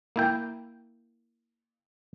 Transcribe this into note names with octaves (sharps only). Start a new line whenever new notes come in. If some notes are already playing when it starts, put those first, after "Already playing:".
A#3 E4 G5